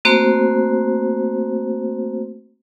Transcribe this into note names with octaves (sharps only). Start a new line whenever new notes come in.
A3 A#3 C4 F#4 C5